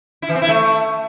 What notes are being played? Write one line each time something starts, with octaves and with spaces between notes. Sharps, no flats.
E4
E3
C4
E4
A3